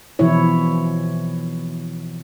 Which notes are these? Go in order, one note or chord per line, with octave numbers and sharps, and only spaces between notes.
B2 E3 F3 E4 C#5